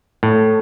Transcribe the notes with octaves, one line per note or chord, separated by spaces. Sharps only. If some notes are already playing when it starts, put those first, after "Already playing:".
A2